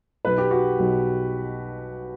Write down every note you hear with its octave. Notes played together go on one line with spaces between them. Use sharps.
B1 B2 B4
G4
F#4
B1 B2